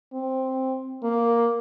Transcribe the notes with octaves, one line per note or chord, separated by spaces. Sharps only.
C4
A#3